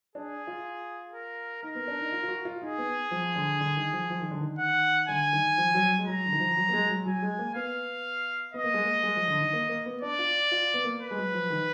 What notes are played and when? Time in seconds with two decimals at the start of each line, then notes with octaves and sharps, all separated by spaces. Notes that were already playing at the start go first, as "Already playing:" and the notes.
0.15 D4 G#4
0.47 F4
1.14 A#4
1.63 D#4 A#4
1.75 B3
1.87 D4
2.00 D#4
2.13 F4
2.23 F4
2.28 F#4
2.45 F4
2.62 D#4 G#4
2.78 B3
3.11 F3
3.36 D3
3.61 D3
3.77 D#3
3.93 F3
4.10 F3
4.20 D#3
4.31 D3
4.41 D#3
4.59 F#5
5.08 D3 G#5
5.33 D#3
5.58 F3
5.75 F#3
5.99 G#3
6.07 F#3 A#5
6.26 D3
6.33 D#3
6.40 F3
6.56 F#3
6.68 A#3
6.73 G#3
6.89 F#3
7.06 F#3 G#5
7.22 G#3
7.39 A#3
7.55 B3 F5
8.54 B3 D#5
8.64 A#3
8.74 G#3
8.84 A#3
9.03 G#3
9.16 F3
9.28 D3
9.41 D#3
9.53 A#3
9.69 A#3
9.86 B3
10.02 D4 D5
10.19 F4
10.52 F4
10.74 B3
10.84 A#3
11.00 B4
11.11 G#3
11.17 F#3
11.34 F3
11.50 D#3